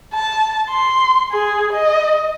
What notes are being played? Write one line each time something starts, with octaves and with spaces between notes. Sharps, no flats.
A5
C6
G#4
D#5